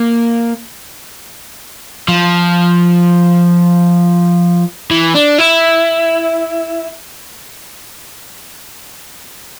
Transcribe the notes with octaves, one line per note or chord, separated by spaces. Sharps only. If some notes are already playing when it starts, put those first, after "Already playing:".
Already playing: A#3
F3
E3
D4
E4